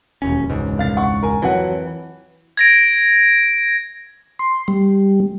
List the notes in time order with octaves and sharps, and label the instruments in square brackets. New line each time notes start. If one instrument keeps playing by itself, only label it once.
[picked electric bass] E1 D#2 C#4
E1 C#2 G#2
[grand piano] C2 F5 A6
F#5 C#6
A#4 G#5
[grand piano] F2 F#3 F#5 [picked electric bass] E3
[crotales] G#6 A#6 D7
[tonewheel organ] C6
G3